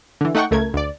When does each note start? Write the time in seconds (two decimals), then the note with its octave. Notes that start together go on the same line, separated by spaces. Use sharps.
0.21 D3 E3
0.35 A3 D#4 F#5 G5 C#6
0.51 C#2 A3 A#4 G#6
0.74 D2 D5